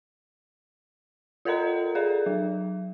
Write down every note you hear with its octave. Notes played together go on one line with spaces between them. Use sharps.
F4 A4 A#4 D#5 A#5
G#4 A4 D5
F#3